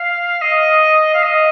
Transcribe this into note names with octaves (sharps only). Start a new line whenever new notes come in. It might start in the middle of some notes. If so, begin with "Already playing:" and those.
Already playing: F5
D#5
F5
D#5